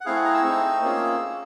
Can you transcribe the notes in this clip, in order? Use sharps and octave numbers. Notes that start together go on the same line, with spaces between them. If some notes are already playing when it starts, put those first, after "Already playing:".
F#5
A3 C4 E4 G#4 F5
F#5
A#5
E6
A3 C4 D#4
A#3 C#4 F4 G#4